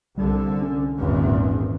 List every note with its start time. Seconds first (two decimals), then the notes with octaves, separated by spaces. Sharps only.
0.18 C2 D3 G3
0.62 C#4
0.98 G#1 E2 A#2